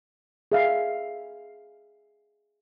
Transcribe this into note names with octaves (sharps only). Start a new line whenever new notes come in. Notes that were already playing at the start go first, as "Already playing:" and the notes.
G#4 E5 F5